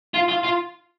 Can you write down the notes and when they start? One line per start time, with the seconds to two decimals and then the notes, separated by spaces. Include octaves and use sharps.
0.14 F4
0.29 F4
0.44 F4